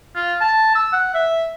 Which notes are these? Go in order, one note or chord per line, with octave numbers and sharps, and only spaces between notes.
F4
A5
E6
F#5
E5